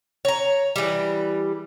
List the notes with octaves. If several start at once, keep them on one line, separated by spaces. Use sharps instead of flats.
C#5 A#5
E3 G3